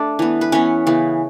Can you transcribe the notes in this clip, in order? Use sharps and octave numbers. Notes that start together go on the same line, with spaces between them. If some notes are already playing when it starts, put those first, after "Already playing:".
Already playing: A3 D4 D5
E3 B3
B4
E3 B3 C#4 C#5
C#3 E3 B3